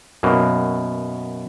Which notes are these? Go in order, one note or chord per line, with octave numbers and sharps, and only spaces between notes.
F#2 B2 A#3